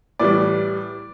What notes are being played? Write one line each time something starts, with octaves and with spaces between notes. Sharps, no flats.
A2 E3 G3 D5